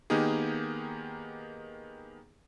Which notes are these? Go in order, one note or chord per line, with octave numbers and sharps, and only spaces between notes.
D#3 A#3 B3 D#4 G4 G#4